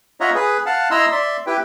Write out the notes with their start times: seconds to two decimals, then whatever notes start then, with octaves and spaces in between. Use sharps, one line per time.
0.21 F4 C#5 D#5 E5 F#5 A#5
0.35 G#4 B4
0.66 F5 F#5 A5
0.91 E4 D#5 A#5 C6 E6
1.12 D5 E5 C6
1.47 E4 G4 B4 G5